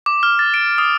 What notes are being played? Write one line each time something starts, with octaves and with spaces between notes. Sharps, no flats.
D6
F6
A6
D7
D#6